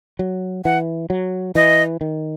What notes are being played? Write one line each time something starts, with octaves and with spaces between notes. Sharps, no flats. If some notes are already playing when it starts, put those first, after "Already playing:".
F#3
E3 F#5
F#3
E3 D#5
D#3